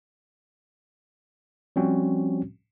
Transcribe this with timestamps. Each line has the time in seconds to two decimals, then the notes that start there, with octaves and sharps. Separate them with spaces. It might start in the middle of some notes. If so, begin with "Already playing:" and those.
1.76 F3 G3 C4 C#4 F#4